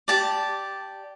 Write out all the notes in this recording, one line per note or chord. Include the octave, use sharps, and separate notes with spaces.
G4 D5 A5